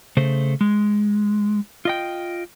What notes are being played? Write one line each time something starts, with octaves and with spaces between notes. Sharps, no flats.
C#3 A3 C5
G#3
F4 D#5 G5